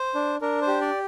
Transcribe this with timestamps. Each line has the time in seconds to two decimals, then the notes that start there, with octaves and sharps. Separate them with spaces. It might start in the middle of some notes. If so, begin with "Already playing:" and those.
Already playing: C5
0.15 D4
0.41 D4 A#4
0.61 C5
0.67 G4
0.81 D5